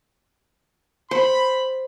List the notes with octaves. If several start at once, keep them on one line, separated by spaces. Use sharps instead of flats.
C5 B5